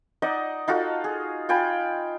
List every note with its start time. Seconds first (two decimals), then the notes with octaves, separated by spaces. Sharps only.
0.22 D#4 D5 D#5 F#5
0.68 D#4 F4 F#4 A4
1.04 G#4
1.49 F4 G5 G#5 B5